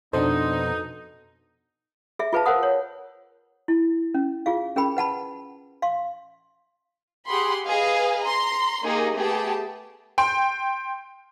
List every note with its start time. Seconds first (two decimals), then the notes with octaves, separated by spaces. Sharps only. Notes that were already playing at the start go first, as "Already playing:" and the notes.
0.13 F2 B2 B3 D4 D#4 A4 C5
2.19 G#4 E5
2.33 F4 G#4 B4 F5 A5
2.46 A#4 C5 F5 F#5 D#6
2.63 C#5
3.68 E4
4.15 C#4
4.46 F4 G#4 F5
4.76 C#4 G#4 A#4 G5 B5
4.97 B4 F#5 A5 B5
5.82 F5 C6
7.27 G4 G#4 F#5 B5 C6
7.67 G#4 B4 D#5 F5
8.24 A#5 C6
8.85 A#3 D#4 G4 G#4 A#4
9.16 A3 B3 G4 G#4 A5
10.18 G5 C6